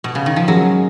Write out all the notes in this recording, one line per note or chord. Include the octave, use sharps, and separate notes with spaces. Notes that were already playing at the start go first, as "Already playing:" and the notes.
B2
C#3
D#3
F3
G#2 D#3 F#3 G#3 C#4 G#4